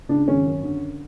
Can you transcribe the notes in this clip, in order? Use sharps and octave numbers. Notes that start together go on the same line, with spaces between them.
C#2 D4
G#1 C#4
F#2
D3